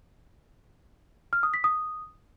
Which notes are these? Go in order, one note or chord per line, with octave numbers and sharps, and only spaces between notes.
F6
D#6
B6
D#6